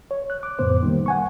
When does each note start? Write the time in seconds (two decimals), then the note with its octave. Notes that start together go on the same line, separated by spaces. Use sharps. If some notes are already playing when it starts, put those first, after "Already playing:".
0.11 C#5
0.30 F#6
0.43 D6
0.59 F2 A2 C#3 B3 C5
0.83 D#3 G3 A#3
1.06 F#5 G#5 C#6